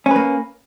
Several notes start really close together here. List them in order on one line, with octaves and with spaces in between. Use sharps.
C#4 B4 A#3